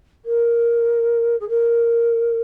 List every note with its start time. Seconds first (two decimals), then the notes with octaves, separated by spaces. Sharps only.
0.25 A#4
1.40 G#4
1.49 A#4